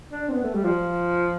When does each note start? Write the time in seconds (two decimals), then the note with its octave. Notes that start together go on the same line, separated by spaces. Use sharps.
0.12 D4
0.28 C4
0.32 B3
0.43 A3
0.54 G3
0.64 F3